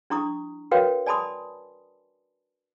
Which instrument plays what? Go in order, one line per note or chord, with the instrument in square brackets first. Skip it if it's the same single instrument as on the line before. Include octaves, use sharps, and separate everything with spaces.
[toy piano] D4 E4 A#5 C#6 D#6
F#4 A#4 B4 C#5 F5 G5
D5 G#5 A5 B5 C6 D#6